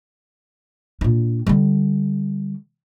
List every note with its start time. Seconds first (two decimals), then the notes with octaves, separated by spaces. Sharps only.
1.01 A#2 D4
1.47 D3 G3